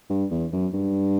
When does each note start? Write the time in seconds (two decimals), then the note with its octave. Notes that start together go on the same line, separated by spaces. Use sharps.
0.10 G2
0.31 E2
0.52 F#2
0.73 G2